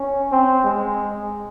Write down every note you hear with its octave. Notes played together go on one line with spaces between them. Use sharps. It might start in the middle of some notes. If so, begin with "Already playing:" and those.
Already playing: C#4
C4
G#3